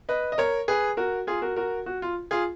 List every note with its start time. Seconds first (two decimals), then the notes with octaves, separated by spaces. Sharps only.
0.09 B4 D#5
0.32 D#5
0.38 A#4 C#5
0.68 G#4 B4
0.97 F#4 A#4
1.27 F4 G#4
1.42 F#4 A#4
1.56 F#4 A#4
1.86 F#4
2.02 F4
2.31 F4 G#4